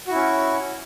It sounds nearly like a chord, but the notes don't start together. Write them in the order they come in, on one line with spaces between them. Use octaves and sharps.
F#4 E4 C#4